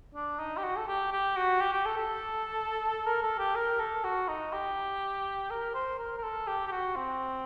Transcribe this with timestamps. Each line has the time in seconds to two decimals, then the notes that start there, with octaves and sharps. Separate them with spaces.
0.14 D4
0.39 D#4
0.57 G4
0.63 F#4
0.76 A4
0.88 G4
1.12 G4
1.37 F#4
1.61 G4
1.73 G4
1.85 A4
1.97 A4
3.06 A#4
3.23 A4
3.39 G4
3.55 A#4
3.80 A4
4.04 F#4
4.28 D#4
4.53 G4
5.50 A#4
5.74 C5
5.99 A#4
6.18 A#4
6.23 A4
6.47 G4
6.68 G4
6.71 F#4
6.96 C4